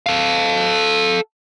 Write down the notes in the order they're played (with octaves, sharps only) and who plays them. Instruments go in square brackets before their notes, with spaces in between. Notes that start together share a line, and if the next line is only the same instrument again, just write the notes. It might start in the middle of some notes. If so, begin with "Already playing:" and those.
[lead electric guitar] A4 F5